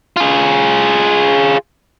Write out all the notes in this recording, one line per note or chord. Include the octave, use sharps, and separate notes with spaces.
F4 G#4